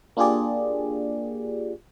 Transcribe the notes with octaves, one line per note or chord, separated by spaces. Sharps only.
A#3 D4 F4 G4 G#4 D5